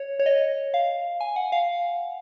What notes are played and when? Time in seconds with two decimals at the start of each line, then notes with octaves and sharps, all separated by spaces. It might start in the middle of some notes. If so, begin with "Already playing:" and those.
Already playing: C#5
0.19 C#5
0.26 D#5
0.74 F5
1.20 G#5
1.36 F#5
1.52 F5